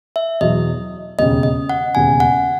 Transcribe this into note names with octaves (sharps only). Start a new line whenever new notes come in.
E5
E2 B2 F#3 D#5
E1 D#2 C#3 D#5
D#5
F#5
E1 D#2 C#3 G#5
F#5